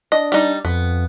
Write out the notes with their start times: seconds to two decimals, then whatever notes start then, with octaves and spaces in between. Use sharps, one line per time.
0.12 D4 D#5
0.32 G3 D#4
0.65 F2 B3